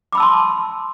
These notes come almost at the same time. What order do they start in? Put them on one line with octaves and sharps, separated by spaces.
D6 B5 E6 A5 C6